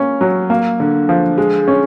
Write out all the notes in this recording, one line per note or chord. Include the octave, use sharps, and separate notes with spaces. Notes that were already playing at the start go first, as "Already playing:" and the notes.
Already playing: A#3 C#4
F#3
A#3
D3
F3
G#3
C#4